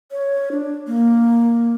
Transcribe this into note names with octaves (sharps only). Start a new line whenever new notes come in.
C#5
D4
A#3